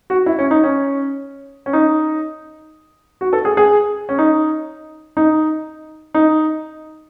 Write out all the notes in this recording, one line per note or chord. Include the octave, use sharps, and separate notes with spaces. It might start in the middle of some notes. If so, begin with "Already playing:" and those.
F#4
E4
C#4
D#4
C#4
C#4
D#4
F#4
A4
G#4
G#4
C#4
D#4
D#4
D#4